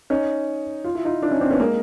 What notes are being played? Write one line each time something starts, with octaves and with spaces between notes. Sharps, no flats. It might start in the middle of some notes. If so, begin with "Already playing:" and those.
C#4 D#4
F4
E4
D#4 F4
D4 E4
C#4 D#4
C4 D4
B3 C#4
G#3 A#3